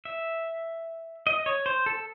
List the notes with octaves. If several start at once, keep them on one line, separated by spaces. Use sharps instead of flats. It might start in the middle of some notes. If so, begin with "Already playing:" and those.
E5
D#5
C#5
C5
A4